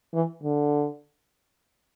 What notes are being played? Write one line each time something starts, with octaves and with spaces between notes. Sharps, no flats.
E3
D3